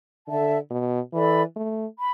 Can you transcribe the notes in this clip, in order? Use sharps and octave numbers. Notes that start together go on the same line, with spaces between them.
D3 A4 E5 A5
B2
E3 A4 D5 B5
A3
B5